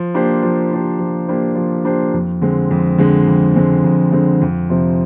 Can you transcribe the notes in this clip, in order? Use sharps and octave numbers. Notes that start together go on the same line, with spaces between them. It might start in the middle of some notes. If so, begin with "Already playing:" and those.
Already playing: F3
A#3 D4 G4 C5
F3
A#3 D4 G4 C5
F3
A#3 D4 G4 C5
F3
A#3 D4 G4 C5
F2
D3 G#3 C4
F2
D3 G#3 C4
F2
D3 G#3 C4
F2
D3 G#3 C4
F2
C3 F3 C4